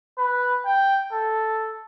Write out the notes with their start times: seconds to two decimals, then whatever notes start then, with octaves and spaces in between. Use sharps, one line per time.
0.18 B4
0.66 G5
1.12 A4